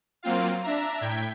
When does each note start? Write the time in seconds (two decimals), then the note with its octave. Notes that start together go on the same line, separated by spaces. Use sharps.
0.23 F#3 A#3 C4 F4 F5
0.63 D4 E5 A#5
1.01 A2 G5 G#6 B6